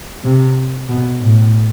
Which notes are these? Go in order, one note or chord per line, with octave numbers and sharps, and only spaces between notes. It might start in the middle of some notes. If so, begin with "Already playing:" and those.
C3
B2
A2